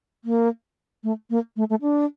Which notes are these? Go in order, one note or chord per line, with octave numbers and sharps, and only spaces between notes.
A#3
A3
A#3
A3
A3
D4